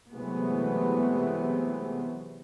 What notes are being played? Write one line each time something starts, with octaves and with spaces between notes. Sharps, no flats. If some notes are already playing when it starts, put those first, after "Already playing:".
C3 E3 F#3 G#3 A3 B3